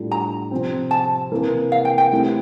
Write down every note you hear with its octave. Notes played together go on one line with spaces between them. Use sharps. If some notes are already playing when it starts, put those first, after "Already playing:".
Already playing: A2 G3 D4 F4 A4
A#5
C3 F3 C4
A5
C3 E3 A#3
F5
G5
G5
E3 A3 C4 E4 G4